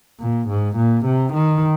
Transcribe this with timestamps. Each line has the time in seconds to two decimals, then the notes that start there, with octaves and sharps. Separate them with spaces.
0.20 A#2
0.49 G#2
0.76 A#2
1.05 C3
1.33 D#3